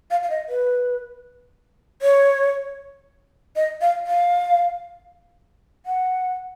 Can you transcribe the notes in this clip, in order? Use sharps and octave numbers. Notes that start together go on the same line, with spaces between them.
F5
F5
D#5
B4
C#5
D#5
F5
F5
F#5